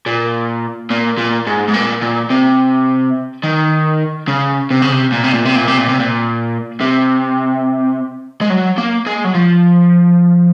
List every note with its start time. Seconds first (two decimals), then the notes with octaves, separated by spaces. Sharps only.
0.06 A#2
0.90 A#2
1.18 A#2
1.47 G#2
1.68 G#2
1.74 A#2
2.02 A#2
2.30 C3
3.43 D#3
4.28 C#3
4.71 C3
4.82 C#3
4.92 C3
5.12 A#2
5.24 C3
5.34 A#2
5.45 C3
5.56 A#2
5.67 C3
5.78 A#2
5.89 C3
6.00 A#2
6.81 C3
8.41 G#3
8.50 F#3
8.78 A#3
9.07 G#3
9.25 F#3
9.35 F3